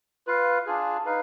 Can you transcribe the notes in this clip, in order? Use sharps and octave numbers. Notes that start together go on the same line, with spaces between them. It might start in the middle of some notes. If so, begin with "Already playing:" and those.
F4 B4 F5
D4 F4 G#4
D#4 B4 F5